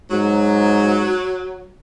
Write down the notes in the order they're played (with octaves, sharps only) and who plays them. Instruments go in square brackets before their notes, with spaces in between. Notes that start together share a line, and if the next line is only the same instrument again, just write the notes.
[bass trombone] G#2 [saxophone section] F#3